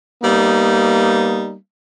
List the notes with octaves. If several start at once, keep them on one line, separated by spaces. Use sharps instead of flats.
G3 A#3 B3 D#4